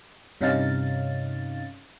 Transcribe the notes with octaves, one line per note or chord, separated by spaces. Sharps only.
G2 C3 C#4 D#4 F5 A6